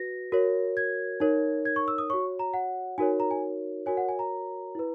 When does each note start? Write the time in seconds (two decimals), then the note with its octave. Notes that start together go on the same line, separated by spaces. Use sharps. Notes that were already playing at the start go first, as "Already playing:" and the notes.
Already playing: F#4 B4 A#6
0.32 F#4 A#4 C#5
0.77 G#6
1.20 D#4 A#4 C#5
1.65 G#6
1.76 C#6
1.88 E6
1.98 D#6
2.10 F#4 C#5 C#6
2.39 A#5
2.54 F#5
2.98 D#4 F#4 A#4 C#5 G#5
3.20 A#5
3.31 G#5
3.86 F#4 A#4 C#5 G#5
3.97 F#5
4.09 G#5
4.19 A#5
4.75 E4 B4